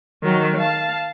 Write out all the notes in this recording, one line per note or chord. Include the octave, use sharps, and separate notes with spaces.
D#3 F#3
F5 A5